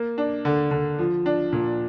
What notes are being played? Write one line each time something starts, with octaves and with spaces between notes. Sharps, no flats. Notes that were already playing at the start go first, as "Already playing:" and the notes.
Already playing: A#3
D4
D3
D3
F3
D4
A#2